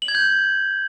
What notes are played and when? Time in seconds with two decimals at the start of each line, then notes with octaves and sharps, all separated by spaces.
0.02 F#7
0.08 G#6
0.15 G6